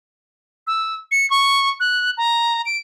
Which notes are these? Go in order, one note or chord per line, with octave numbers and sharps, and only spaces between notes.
E6
C#7
C#6
F#6
A#5
D7